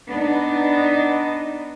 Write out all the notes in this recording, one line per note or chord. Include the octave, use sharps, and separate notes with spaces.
B3 D4 D#4